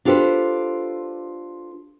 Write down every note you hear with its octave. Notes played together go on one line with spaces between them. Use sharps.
D4 F4 G4 A4 B4 C5